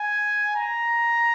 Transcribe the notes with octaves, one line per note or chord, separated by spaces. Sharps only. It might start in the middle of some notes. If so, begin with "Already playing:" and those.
Already playing: G#5
A#5